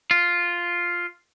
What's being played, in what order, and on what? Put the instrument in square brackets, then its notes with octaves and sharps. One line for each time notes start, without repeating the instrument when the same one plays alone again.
[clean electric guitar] F4